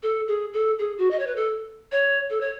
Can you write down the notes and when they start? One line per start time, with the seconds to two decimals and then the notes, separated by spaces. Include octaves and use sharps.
0.03 A4
0.28 G#4
0.53 A4
0.79 G#4
0.98 F#4
1.11 D#5
1.19 C#5
1.27 B4
1.36 A4
1.92 C#5
2.30 A4
2.41 C#5